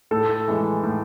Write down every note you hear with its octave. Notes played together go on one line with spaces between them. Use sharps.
A2 A4
E3 G#3
A2